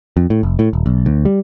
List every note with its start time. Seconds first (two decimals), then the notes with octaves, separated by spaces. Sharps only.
0.17 F2
0.30 A2
0.43 F1
0.59 A2
0.73 D#1
0.86 B1
1.06 D2
1.25 G3